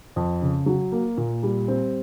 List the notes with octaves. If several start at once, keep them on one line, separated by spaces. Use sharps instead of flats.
F2
C#3
F#3
A#3
A#2
G3
C4